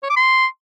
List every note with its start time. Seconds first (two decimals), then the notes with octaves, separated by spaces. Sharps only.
0.03 C#5
0.10 D6
0.17 C6